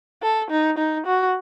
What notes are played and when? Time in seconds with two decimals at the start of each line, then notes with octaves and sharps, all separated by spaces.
0.22 A4
0.50 D#4
0.78 D#4
1.06 F#4